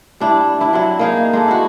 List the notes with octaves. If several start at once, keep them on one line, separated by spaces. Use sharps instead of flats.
G3 D4 E4
D4 E4
F#3 C4 E4
A#3 D#4 G#4
G#3 D4 A4
E4 F#4